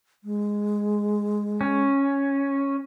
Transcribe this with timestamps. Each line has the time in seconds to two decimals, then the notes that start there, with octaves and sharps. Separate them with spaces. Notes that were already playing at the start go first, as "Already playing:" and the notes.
0.24 G#3
1.61 C#4